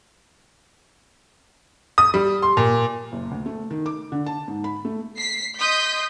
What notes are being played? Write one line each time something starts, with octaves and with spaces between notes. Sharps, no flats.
D#6
G3
C6
A#2
F#1
D2
A3
D#3
D6
D3
A5
G#2
B5
A3
B6 C7
D#5 C6 D#6 G6 B6